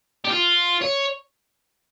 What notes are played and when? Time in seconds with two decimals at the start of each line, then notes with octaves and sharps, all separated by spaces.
0.25 G4
0.31 F4
0.82 C#5